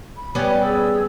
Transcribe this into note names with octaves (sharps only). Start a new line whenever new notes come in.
B5
G3 B3 C#4 G4 B4 D5
G#4 E6